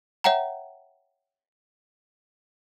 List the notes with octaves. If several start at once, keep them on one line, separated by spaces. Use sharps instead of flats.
C#5 E5 F#5 G5 A#5